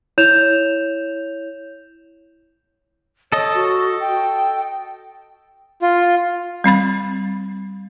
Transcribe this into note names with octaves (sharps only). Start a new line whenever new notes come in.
E4 C#5 G6 E7 F7
A4 C#5 D#5
F#4
G5
F4
G3 C4 B5 A6